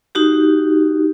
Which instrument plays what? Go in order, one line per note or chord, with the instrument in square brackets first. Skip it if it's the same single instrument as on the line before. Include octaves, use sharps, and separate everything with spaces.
[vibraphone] D#4 F#4 G4